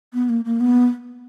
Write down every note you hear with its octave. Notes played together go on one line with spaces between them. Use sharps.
B3
A#3
A#3
B3